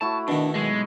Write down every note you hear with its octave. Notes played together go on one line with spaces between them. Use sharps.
A3 E4 F#4 A5
B2 D#3 D4
B1 G#3